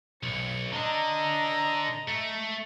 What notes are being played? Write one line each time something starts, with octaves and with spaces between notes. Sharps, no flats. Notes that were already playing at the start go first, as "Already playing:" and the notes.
B1 C#7
D3 D4 D#5 A#5
A3